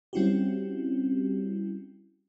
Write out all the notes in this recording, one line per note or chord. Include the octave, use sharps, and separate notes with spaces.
G3 C4 C#4 E4 F#4 G4